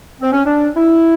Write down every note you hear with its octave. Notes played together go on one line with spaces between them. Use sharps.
C4
C#4
D4
E4